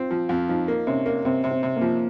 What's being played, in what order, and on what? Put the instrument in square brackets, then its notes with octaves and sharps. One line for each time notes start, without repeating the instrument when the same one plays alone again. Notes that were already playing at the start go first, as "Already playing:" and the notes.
Already playing: [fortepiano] C4 [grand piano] F4
[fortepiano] F3
F2
[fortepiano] F3 [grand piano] D#4
[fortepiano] A#3
[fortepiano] C3 [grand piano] C#4
[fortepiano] A#3
[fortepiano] C3 [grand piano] C4
[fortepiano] C3
[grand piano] C4
[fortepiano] C3
[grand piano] A#3
[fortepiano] F3